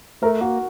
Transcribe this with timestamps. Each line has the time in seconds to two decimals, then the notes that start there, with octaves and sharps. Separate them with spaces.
0.22 A3 A#4
0.41 A#3 F#4